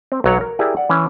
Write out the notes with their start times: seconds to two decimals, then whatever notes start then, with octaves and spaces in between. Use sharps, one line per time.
0.12 C4
0.24 B1 F#3 C#5 F#5
0.41 A#4
0.59 E4 G4 G#4 A#4 D5
0.77 D5 F#5
0.89 E3 C#4